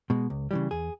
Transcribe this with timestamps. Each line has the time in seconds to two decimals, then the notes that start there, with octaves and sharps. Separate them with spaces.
0.10 B2 G#3
0.30 C#2
0.51 C#3 E3 G3
0.71 E2 G#4